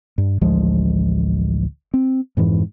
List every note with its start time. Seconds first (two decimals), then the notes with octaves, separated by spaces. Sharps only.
0.18 G2
0.41 A1 D2 F3 G#3
1.94 C4
2.37 F2 G#2 E3